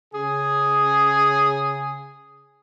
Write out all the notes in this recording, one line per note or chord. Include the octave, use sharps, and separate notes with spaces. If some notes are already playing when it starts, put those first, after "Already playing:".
C#3 G#4